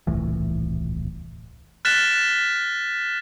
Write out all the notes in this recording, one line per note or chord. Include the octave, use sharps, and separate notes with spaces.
D#1 C2 A2 E3
F6 F#6 A6 B6 E7